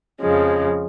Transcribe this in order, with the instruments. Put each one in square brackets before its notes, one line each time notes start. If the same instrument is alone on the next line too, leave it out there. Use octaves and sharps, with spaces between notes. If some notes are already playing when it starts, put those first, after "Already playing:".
[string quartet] F2 C#3 F3 G#3